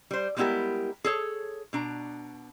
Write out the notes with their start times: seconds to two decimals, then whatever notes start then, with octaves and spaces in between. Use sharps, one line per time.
0.11 G3 C5
0.36 G3 G#3 B3 E4 G4 A#4
1.04 G#4 A4 C#5
1.73 B2 D4 A#5